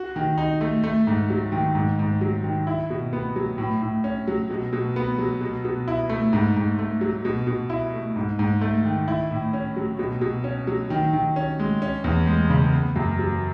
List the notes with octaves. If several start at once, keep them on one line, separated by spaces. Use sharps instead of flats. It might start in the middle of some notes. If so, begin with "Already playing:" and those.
Already playing: F#4
D#3
D#4
A3
A3
G#2
F#3
D#3
G#2
G#2
F#3
D#3
E4
B2
B3
F#3
A2
A2
C#4
F#3
B2
B2
B3
F#3
B2
B2
E4
A3
G#2
G#2
A3
F#3
B2
B2
E4
A3
G#2
G#2
A3
D#3
E4
A2
C#4
F#3
B2
B2
C#4
F#3
D#3
D#3
C#4
G#3
C#4
E2
G#3
C#3
B3
F#2
F#3